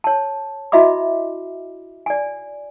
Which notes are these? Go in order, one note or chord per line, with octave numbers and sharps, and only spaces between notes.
C#5 A5
E4 F#4 D#5 E5 B5 D6
D5 G#5